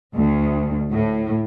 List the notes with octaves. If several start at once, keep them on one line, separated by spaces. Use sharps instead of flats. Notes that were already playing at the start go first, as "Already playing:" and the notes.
D2
A2